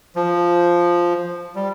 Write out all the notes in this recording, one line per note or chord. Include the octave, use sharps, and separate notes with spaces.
F3
G3